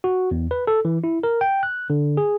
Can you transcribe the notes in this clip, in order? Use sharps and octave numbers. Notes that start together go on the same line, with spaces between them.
F#4
E2
B4
A4
E3
E4
A#4
G5
F#6
D3
G#4